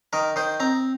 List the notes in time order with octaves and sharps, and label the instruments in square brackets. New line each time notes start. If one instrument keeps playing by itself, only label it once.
[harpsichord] D#3 A#4
D#3 C5
C4 A#5